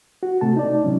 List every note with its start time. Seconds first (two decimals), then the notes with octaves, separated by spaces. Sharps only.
0.23 F#4
0.41 C3 A3 A5
0.56 D#4 D5
0.84 C3 F#3 C#4